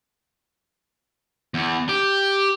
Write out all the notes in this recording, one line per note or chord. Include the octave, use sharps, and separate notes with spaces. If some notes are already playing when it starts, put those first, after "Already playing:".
E2
G4